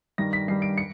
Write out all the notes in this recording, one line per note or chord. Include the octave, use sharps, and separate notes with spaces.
G2 D#3 G3 A#6
B6
G2 D#3 G3 C7
D7
C#7